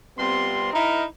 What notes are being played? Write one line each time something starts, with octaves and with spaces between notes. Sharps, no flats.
C3 G3 B3 C4 F4 C6
D#4 E4 A#4